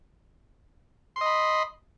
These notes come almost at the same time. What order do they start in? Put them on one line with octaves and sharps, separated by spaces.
C6 D#5 B5